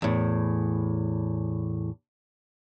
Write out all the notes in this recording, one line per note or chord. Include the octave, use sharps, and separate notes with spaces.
E2 A2